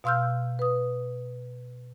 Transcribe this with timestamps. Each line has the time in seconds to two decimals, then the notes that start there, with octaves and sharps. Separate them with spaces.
0.04 B2 F5 C6 E6 F6 G6
0.59 B4 D#6